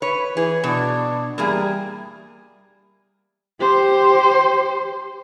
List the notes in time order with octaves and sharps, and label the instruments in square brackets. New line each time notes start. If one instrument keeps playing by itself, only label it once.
[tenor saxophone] B4 [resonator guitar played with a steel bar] C#5
[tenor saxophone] E3 [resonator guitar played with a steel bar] G#4
[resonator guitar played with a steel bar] B2 [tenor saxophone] D4
[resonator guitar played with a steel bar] E2 A#3 G#4 [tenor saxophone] G3
[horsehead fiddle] G4 C5